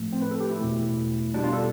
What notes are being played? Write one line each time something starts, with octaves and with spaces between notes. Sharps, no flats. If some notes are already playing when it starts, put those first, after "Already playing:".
Already playing: A2 F3 A3
C4
B4
A4
G4
E4
E2 B2 A3
B2 G3 D4
F4
A4